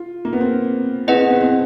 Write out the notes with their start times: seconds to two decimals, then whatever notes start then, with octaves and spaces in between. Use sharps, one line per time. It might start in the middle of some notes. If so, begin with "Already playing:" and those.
Already playing: F4
0.25 A#3
0.33 B3
0.41 C4
1.08 C4 E4 G#4 B4 D#5 F#5
1.30 B3
1.41 C4